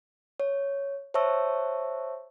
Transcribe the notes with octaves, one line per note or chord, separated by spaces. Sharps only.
C#5
C5 C#5 E5 A5 C#6 E6